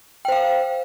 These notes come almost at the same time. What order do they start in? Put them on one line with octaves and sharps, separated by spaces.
G5 C5 F5